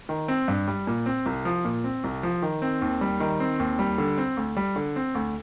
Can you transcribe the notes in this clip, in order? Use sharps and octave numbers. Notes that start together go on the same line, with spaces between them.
D#3
C4
G2
G3
A#2
C4
C2
F3
A#2
C4
C2
F3
D#3
C4
D#2
G3
D#3
C4
D#2
G3
D3
C4
D2
G3
D3
C4
D2